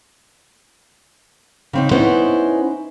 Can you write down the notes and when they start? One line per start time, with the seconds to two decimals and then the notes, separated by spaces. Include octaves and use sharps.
1.73 C#3 C4 D#4
1.91 B3 C#4 D#4 E4 B4 C5